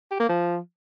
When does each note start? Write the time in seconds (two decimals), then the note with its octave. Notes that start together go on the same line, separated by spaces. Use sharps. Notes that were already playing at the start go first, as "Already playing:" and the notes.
0.11 G4
0.20 A#3
0.29 F3